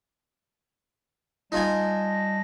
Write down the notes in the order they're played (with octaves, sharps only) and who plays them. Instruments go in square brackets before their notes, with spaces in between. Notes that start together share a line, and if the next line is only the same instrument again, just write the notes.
[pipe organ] G3 A5 A#6 [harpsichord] D#4 F4 G#5